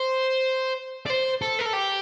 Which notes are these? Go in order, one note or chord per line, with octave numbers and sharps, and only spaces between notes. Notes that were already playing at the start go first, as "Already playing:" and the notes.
Already playing: C5
D5
C5
A4
A#4
A4
G4